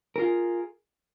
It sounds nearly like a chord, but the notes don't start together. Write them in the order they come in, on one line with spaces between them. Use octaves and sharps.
A#4 F4 G#4